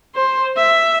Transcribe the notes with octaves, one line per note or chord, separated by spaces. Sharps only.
C5
E5